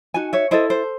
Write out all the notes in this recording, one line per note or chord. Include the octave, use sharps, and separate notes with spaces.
D#4 F#4 G#5
C#5 E5
E4 A4 C5 D#5
C5